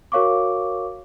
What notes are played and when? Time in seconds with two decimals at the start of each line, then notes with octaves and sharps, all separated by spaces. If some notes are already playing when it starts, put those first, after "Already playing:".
0.12 F#4 A#4 C#5 F5 C#6 D6